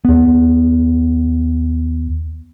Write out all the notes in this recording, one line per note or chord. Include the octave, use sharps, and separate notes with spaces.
D#2 B3